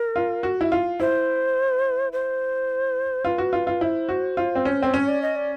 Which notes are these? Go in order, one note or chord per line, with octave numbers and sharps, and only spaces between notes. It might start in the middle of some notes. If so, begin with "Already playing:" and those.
Already playing: A#4
F4
F#4
E4
F4
E4 C5
C5
F4 B4
F#4
F4
F4
E4 C5
F#4
F4
C4
C#4
C4
C#4 C#5
D5
D#5
D5